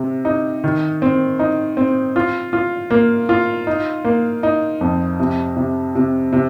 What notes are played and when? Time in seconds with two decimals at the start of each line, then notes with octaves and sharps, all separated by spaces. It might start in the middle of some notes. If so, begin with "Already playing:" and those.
Already playing: C3
0.25 D#4
0.64 D#3
1.02 C4
1.39 D#4
1.77 C4
2.16 F4
2.53 F4
2.91 A#3
3.29 F4
3.67 D#4
4.05 A#3
4.43 D#4
4.81 F2
5.19 C3
5.57 C3
5.95 C3
6.32 C3